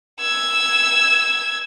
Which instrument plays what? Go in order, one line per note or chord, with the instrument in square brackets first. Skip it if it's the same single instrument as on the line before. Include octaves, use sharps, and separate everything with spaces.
[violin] E6 G#6